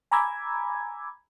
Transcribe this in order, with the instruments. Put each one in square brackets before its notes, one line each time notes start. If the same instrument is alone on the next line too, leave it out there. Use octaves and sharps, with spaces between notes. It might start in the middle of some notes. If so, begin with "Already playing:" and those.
[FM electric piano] G#5 A#5 B5 D6 E6 G#6